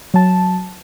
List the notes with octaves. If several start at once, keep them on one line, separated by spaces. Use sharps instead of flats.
F#3 A5